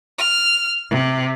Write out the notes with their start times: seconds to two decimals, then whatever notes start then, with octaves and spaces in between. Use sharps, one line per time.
0.20 F6
0.91 C3